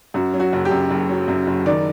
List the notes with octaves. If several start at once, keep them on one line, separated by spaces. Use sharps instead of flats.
F#2 F#4
F#3
F#4
F#1
G4
F#2
F#1
F#3
F#2
F#1
D#3 D5